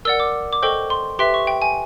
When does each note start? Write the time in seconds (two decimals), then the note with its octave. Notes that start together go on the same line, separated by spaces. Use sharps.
0.05 A#4 D5 F#5 E6
0.20 D6
0.53 D6
0.62 A4 C5 D#5 G5 C#6
0.90 C6
1.19 G4 B4 E5 G5 C6
1.34 C#6
1.47 G5
1.62 G#5